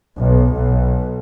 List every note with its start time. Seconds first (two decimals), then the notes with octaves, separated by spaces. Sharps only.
0.16 B1
0.54 B1